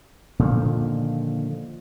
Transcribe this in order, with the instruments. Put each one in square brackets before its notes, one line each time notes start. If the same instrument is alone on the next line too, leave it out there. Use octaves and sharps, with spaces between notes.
[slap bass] A#2 D3 D#3 F3